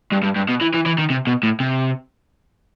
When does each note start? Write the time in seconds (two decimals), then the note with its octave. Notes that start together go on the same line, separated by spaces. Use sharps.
0.12 G2
0.23 G2
0.36 G2
0.49 B2
0.61 E3
0.74 E3
0.86 E3
0.98 D#3
1.10 C3
1.27 B2
1.43 A2
1.60 C3